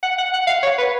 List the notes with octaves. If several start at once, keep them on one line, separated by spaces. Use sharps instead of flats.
F#5
F#5
F#5
F5
C#5
B4